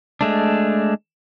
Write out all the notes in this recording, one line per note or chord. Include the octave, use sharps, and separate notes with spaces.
G#3 A3 D4